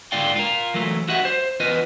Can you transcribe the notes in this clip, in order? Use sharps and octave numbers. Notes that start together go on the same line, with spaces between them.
G#2 D3 F4 D5 F5 G5
F4 A#4
E3 F#3 A3
F#4 G4 D#5 E5 F#5
C5
E2 F4 B4 D#5